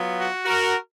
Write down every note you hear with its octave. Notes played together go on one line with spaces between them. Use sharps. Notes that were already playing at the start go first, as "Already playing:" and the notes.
Already playing: F#3 B3 F4
F#4
F#4 A#4